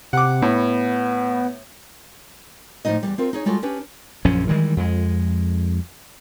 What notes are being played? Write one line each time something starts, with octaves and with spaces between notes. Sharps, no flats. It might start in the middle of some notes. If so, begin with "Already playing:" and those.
C3 F#5 D6
A2 B3
A2 F3 F#3 D#4 D#5
E2 D#3 G3
C4 F4 A#4
D#4 G#4 C#5
G3 G#3 F4 F#4 A4
C#4 D4 G4 B4
A#1 F#2 F3 C#4
D#3 E3 G3 G#3
F2 G#3